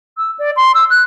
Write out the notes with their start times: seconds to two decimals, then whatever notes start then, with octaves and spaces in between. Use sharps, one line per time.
0.17 E6
0.39 D5
0.56 C6
0.74 E6
0.90 F#6